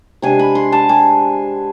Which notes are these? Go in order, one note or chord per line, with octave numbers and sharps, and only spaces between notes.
C3 G#3 D4 G#5
B5
C6
A5
G#5